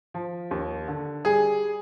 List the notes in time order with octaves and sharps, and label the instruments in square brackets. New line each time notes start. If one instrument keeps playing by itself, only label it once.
[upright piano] F3
D#2
D3
G3 G#4